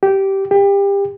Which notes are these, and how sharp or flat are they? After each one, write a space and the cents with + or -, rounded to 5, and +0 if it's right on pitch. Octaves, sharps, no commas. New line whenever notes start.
G4 -15
G4 +25